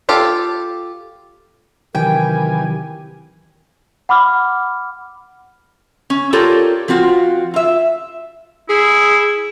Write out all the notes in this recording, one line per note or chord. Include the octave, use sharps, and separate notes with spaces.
F4 G4 A4
C3 D#3 E3 F#3 G4 A#4 G5 G#5
F#5 B5 D6 F6
C#4
F4 G4 A4 A#4 C#5 D5
F3 C4 F4 F#4
F4 E5
E4 G#4